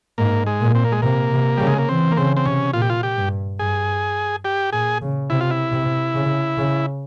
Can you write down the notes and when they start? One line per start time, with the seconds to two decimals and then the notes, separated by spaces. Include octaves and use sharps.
0.18 G#2 A#3
0.46 G#3
0.61 A#2
0.75 C4
0.84 A#3
0.92 G#3
1.02 C3 A#3
1.32 C3
1.57 C#3 G3
1.67 G#3
1.78 A#3
1.89 E3 C4
2.12 A#3
2.17 C#3 C4
2.37 C4
2.46 C3 C#4
2.73 A#2 F4
2.82 G4
2.90 F4
3.03 G4
3.17 G2
3.59 G2 G#4
4.45 G4
4.73 A#2 G#4
5.02 C#3
5.30 C3 E4
5.41 F4
5.51 E4
5.72 C3
6.15 C#3
6.58 C#3